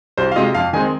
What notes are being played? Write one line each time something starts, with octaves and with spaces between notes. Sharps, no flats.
C2 C5
F5
C3 G#3 F4 D#5
F2 F5
D#3 G#3 C4 G#5